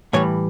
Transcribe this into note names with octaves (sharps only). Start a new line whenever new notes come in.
A2 E3 G3 C#5